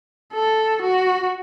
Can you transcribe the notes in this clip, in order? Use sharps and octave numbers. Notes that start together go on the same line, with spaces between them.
A4
F#4